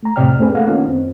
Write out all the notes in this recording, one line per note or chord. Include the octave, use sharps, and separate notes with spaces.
A3 A#5
F2 A2 C3 D5 G5 F6
A3 C4 D4 G#4 B4
A3 A#3 D4 A4 F5 F#5
D#3 A#3 B3 C#4 D#4 F4
F#2 C4